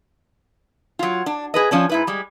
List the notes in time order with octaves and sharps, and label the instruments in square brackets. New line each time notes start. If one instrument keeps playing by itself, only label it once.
[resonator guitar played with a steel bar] F#3 F4
D4
G#4 B4 D#5
F3 C#4 D4
G#2 E4 B4
G3 G#3